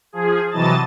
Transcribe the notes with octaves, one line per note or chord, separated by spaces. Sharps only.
F3 G#4
C3 E3 F#3 D#5 A5 A6